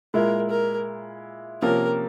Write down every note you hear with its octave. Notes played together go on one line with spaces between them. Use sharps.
A#2 G#3 E4 A#4
A#4
C3 F3 A#3 C#4 A#4